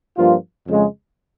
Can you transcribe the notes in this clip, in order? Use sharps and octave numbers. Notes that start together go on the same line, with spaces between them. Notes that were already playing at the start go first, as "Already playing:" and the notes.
G2 F3 A#3 F4
F2 C#3 G#3